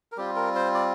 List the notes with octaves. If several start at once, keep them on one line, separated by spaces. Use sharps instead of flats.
A#4
G3 C4 F4 G4
A#4
C5
D5